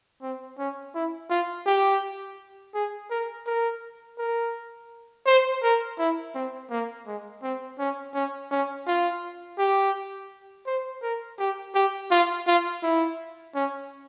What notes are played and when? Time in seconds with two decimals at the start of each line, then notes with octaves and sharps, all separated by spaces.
0.21 C4
0.58 C#4
0.94 E4
1.30 F4
1.66 G4
2.74 G#4
3.10 A#4
3.46 A#4
4.18 A#4
5.26 C5
5.62 A#4
5.98 E4
6.35 C4
6.70 A#3
7.06 G#3
7.42 C4
7.79 C#4
8.14 C#4
8.51 C#4
8.87 F4
9.58 G4
10.66 C5
11.02 A#4
11.39 G4
11.75 G4
12.11 F4
12.47 F4
12.83 E4
13.55 C#4